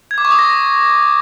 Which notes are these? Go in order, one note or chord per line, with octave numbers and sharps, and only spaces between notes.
G#6
D6
C#6
D#6
A#6